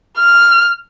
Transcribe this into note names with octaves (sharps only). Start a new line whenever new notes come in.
F6